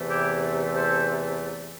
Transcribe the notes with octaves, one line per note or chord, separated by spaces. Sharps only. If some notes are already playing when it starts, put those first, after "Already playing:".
Already playing: E2 C3 E3 A3
E4 G4
A4 C5